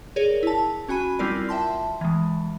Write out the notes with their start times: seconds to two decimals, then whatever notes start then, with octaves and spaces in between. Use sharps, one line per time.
0.16 G#4 A#4 C#5 D5
0.43 E4 A5
0.88 C#4 F#4 G#5 B5 D#7
1.19 G3 C4 E4 F4 A#4 D5
1.49 E5 G5 A5 C6
2.01 E3 G#3